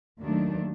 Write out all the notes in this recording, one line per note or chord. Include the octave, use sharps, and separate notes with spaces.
D#2 D#3 F#3 A3 D4